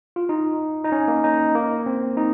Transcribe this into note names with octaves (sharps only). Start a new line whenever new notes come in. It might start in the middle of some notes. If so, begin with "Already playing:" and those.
F4
D#4
D#4
C#4
A#3
D#4
A#3
C4
D#4